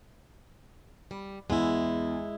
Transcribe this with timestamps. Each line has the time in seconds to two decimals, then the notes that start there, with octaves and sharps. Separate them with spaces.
1.11 G3
1.50 E2 G#3 E4